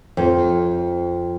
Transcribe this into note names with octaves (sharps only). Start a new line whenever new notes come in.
F2